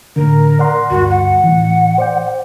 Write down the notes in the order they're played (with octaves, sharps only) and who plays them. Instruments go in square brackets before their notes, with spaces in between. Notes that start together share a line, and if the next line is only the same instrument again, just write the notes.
[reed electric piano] A2 D3 [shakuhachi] A#4
[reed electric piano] D5 F#5 C6
[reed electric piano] D2 G2 [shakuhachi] F#4
[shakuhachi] F#5
[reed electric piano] A2 E3
C5 D5 G5